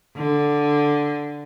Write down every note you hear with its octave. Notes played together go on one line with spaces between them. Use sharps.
D3